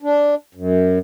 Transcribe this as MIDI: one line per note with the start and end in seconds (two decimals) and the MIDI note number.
0.02 0.35 62
0.55 0.99 42